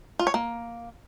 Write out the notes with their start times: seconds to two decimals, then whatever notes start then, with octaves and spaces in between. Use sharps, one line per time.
0.19 F4
0.27 C#5
0.34 A#3